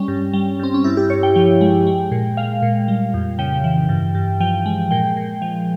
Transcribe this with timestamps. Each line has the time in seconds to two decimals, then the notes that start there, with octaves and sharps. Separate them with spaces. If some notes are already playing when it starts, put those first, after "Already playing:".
Already playing: G3 C#4
0.08 G2
0.33 G3
0.59 G2 C4
0.74 C#4
0.84 G2 E4
0.97 G4
1.10 G2 C#5
1.23 G5
1.36 F3 G5
1.61 G#3
1.87 G#3
2.12 A#2
2.37 G#3 F5
2.62 A#2
2.88 G3
3.14 F2
3.39 C#3 G5
3.64 E3
3.89 G2
4.15 G2
4.40 F3 G5
4.66 G#3
4.91 A#2 G5
5.17 A#2
5.42 F3